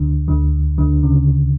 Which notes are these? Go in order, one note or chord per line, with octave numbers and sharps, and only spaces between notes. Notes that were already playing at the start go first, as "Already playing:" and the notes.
Already playing: D2 D3
D2 D3
D2 D3
C#3